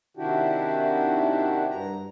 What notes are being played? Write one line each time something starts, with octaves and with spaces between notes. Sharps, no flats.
C3 D#3 D4 E4 F#4 G4
G2 A#5